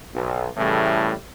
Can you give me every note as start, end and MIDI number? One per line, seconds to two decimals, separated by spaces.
0.14 0.49 35
0.57 1.12 45
0.57 1.12 49
0.57 1.12 52
0.57 1.12 55
0.57 1.12 57